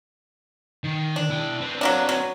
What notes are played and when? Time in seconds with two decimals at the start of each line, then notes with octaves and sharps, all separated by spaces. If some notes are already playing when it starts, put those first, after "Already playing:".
0.84 D#3
1.16 D4
1.30 E4 G5
1.61 B3 C4
1.81 F#3 A#3 D4
2.09 F#3